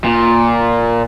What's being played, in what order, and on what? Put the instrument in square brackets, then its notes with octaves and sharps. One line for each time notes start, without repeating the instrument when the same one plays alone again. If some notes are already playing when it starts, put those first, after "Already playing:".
[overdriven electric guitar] A#2